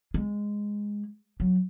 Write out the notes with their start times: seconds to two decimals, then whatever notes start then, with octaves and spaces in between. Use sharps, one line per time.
0.14 G#3
1.40 F#3